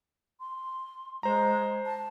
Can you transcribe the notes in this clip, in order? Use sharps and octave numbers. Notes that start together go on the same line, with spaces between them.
C6
G#3 C5 A#5
A5